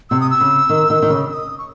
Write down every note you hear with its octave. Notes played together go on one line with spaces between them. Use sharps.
C3 E6
D#6
E6
C#3
D#3
D#3
D#3
C#3
E6
D#6
C#6